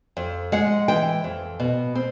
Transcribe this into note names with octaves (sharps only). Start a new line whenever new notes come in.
F2
G#3 F#5
E3 G5
F2
B2
C4